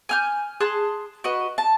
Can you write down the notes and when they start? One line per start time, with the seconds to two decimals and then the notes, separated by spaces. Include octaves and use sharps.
0.09 G#5 F6 G6
0.60 G#4 A5 C6 F#6
1.24 F#4 B4 D#5
1.58 A5